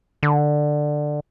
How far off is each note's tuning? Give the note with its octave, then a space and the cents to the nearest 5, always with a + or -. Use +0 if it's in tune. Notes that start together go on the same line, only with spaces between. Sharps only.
D3 +15